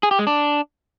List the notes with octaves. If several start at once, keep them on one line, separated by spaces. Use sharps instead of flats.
G#4
G4
G#3
D4